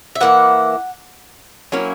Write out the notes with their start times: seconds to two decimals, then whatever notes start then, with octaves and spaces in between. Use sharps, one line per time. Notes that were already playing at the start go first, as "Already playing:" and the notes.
0.15 E5
0.21 E3 A#3 E4 F#5
1.72 F#3 A#3 C#4 E4